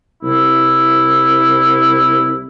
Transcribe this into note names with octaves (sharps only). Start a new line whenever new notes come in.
C2 E4